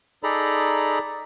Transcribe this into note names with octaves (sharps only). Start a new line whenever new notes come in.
D#4 G#4 A4 D5 A#5 B5